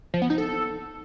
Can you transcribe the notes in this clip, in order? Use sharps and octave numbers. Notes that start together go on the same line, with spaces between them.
F3
B3
D#4
A4